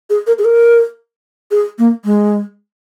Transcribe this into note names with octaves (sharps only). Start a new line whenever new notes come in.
G#4
A#4
G#4
A#4
G#4
A#3
G#3